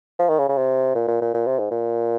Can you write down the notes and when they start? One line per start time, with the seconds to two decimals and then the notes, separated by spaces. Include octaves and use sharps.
0.19 F3
0.29 D#3
0.39 C#3
0.49 C#3
0.58 C3
0.95 A#2
1.08 A#2
1.21 A#2
1.34 A#2
1.47 C3
1.59 G#2
1.71 A#2